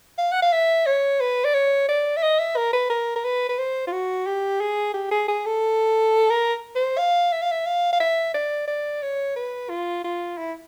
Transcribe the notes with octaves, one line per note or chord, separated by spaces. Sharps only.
F5
F#5
F5
E5
C#5
B4
D5
C#5
D5
E5
D#5
E5
A#4
B4
A#4
A#4
B4
B4
C5
F4
F#4
G4
G#4
G4
G#4
G#4
A4
A#4
C5
F5
E5
F5
E5
F5
F5
E5
D5
D5
C#5
B4
F4
F4
E4